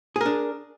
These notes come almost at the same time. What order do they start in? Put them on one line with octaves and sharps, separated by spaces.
G#4 A#4 D4